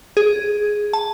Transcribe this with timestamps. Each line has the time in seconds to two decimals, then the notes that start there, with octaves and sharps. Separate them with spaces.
0.17 G#4
0.93 A5